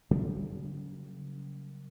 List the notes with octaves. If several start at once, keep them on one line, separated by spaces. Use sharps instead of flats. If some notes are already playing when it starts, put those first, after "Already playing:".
C#3 F#3 G3 A#3